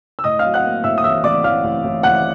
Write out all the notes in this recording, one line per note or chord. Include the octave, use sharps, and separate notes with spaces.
E6
A2 D#5 D#6
F5 F6
F#3
F#5 F#6
A#3
A2 E5 E6
D#6
A1 E5 E6
A1 D5 D6
A1 F5 F6
A1
A1
A1 F#5 F#6